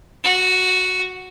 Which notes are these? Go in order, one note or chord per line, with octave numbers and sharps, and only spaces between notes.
F#4